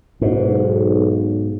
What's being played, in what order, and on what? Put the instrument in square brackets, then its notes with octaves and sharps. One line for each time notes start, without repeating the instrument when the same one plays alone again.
[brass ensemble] B1 [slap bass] G#2